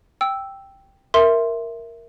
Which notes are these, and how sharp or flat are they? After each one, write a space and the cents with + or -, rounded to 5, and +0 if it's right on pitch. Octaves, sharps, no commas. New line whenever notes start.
G5 +0 E6 +0
A#4 +0 E5 +0 C6 +5